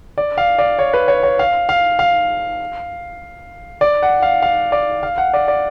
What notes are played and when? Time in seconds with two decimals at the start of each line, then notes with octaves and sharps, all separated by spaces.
0.18 D5
0.38 F5
0.58 D5
0.79 C#5
0.93 B4
1.08 C#5
1.23 C#5
1.39 F5
1.69 F5
1.99 F5
3.81 D5
4.03 F#5
4.22 F5
4.42 F5
4.72 D5
5.03 F5
5.18 F#5
5.34 D5
5.48 D5